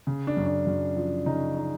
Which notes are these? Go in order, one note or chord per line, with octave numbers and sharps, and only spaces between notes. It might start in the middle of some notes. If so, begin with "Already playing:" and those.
C#3
D4
F#2
D4
F#2
F3
C#3 D#4
D#4